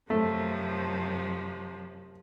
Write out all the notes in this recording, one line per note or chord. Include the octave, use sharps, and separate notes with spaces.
F#2 C3 F3 A3